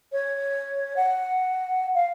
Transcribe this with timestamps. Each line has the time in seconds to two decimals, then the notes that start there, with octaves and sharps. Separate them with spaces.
0.12 C#5
0.96 F#5
1.95 F5